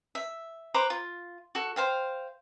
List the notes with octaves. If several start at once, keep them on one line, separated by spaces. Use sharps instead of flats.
E5
B4 C5 A#5 D6
F4
F#4 A4
C5 F5 G5